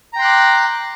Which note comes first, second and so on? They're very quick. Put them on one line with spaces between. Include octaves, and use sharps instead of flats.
A#5 G5 C6 F#6 D6